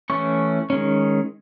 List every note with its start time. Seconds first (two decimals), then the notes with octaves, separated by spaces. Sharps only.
0.10 E3 A3 C#4 C#6
0.70 D#3 G#3 C#4